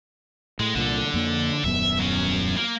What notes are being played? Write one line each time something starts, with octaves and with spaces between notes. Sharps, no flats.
A2 G#3
C2 A#2 D3
F2 A#3 D4
D#1 F#2 B3 E5
F#3 C#4
A#3